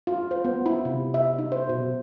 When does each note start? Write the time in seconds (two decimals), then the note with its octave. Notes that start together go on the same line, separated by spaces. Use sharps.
0.07 F4
0.31 C5
0.44 B3
0.66 E4
0.85 C3
1.14 E5
1.39 D#4
1.52 C5
1.69 B2